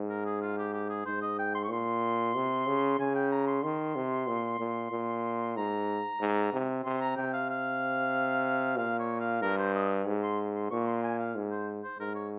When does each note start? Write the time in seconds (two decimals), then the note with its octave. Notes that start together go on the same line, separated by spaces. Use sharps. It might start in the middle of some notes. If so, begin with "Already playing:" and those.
Already playing: G#2
0.09 A#4
0.25 G#4
0.41 F4
0.58 G4
0.73 G4
0.89 G#4
1.06 G#2 C5
1.22 D#5
1.39 G5
1.54 C6
1.64 C#6
1.70 A#2 C6
2.35 C3
2.67 C#3
2.99 C#3 G#5
3.15 G5
3.31 A#5
3.47 C6
3.63 D#3 C6
3.95 C3
4.27 A#2
4.59 A#2
4.91 A#2
5.57 G#2 A#5
6.20 G#2
6.53 C3
6.84 C3 C6
7.01 A#5
7.17 C3 G5
7.33 F5
7.49 F5
8.77 A#2 F5
8.99 C#5
9.20 F5
9.42 G2 A#4
9.58 C5
9.74 D#5
10.07 G#2
10.23 C6
10.55 C6
10.71 A#2 C#6
10.87 C6
11.03 G#5
11.18 F5
11.35 G#2
11.51 C5
11.83 C5
11.99 G#2 A#4
12.15 C#5